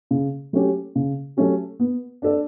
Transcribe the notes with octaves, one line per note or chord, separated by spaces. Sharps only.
C#3
F#3 A3 C#4 G4
C#3
F#3 A3 C#4 G4
B3
D4 A4 D5